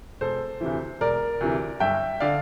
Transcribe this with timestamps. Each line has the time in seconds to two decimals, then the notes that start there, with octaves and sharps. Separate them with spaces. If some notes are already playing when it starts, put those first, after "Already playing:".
0.21 E1 A4 C5
0.61 D2 C3 E3
1.01 E1 A#4 D5
1.41 D2 C3 E3
1.80 G1 E5 G5
2.20 D3 D5 F5